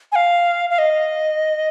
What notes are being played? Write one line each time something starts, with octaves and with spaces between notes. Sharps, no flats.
G#5
F5
F5
D#5